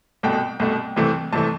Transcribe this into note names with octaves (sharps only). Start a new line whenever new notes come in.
C2 B2 A3 G5
C2 B2 A3
C2 C3 E3 A3
C2 C3 E3 A3 A5